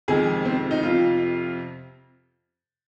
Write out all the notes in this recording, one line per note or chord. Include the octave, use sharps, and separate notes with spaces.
F2 C3 D#3 G#3 G#4
C4
D#4
F2 C3 F3 F4